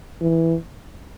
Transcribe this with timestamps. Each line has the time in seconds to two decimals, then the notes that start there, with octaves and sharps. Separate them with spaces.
0.21 E3